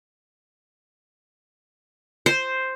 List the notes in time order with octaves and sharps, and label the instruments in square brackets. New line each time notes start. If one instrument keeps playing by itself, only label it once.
[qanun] C5